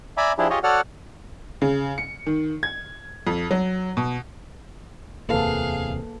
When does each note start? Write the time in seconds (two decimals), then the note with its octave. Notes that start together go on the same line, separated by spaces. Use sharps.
0.17 D5 E5 G#5 A#5 B5 D6
0.38 F3 D4 E4 G4 G#4
0.50 F4 G4 G#4 C#5 D#5
0.63 F#4 A4 C#5 D5 F#5 F6
1.62 C#3
1.98 C#7
2.26 D#3
2.63 G#6
3.27 F2
3.51 F#3
3.97 B2
5.29 D1 E2 C3 A#3 G#4 A4 B4 F5